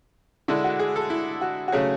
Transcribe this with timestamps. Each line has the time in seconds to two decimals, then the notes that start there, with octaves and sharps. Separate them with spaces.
0.48 D3 G#3 D4 E4
0.64 F#4
0.79 G#4
0.96 A4
1.10 E4
1.41 F#4
1.68 F#4
1.72 C#3 F#3 A3 C#4 G#4